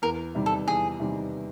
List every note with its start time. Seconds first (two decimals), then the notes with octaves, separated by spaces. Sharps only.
0.02 E2 A#4
0.35 C3 D#3 G3
0.46 A4
0.67 E2 G#4
1.00 C3 D#3 G3